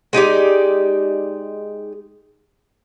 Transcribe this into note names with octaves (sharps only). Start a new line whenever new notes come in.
G#3 D#4 G4 D5